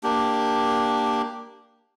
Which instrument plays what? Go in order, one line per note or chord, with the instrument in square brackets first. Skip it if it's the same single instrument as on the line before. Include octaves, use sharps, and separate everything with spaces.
[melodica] A#3 D4 G4